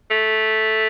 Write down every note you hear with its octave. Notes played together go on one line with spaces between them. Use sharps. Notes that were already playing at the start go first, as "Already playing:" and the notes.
A3